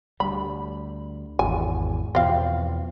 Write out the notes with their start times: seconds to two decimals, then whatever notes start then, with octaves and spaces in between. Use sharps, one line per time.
0.20 D2 G3 B5
1.39 G#1 E2 G#5
2.15 E2 B2 F3 C4 F5